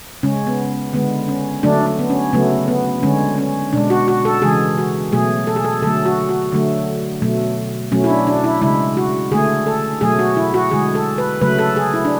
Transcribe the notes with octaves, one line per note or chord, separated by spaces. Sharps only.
C#3 G#3 C#4
B3
D3 G#3 B3
C#4
D3 F#3 A3 D4
D4
B3
C#4
C#3 F#3 A3 B3
B3
D3 G#3 C#4
C#4
B2 G#3 D4
F#4
F#4
A4
C#3 E3 G#3 G#4
F#4
B2 F#3 A3 G#4
A4
G#4
A4
D3 F#3 A3 A4
F#4
F#4
D3 F#3 A3
B2 F#3 A3
B2 F#3 A3 C#4
E4
D4
D4
E4
C#3 G#3 E4
F#4
D3 A3 G#4
A4
B2 F#3 A3 G#4
F#4
E4
F#4
D3 G#3 G#4
A4
B4
C#3 F#3 A3 B4
A4
G#4
E4
D4